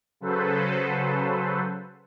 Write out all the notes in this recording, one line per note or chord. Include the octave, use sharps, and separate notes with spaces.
C#3 F#3 A4 B4 C5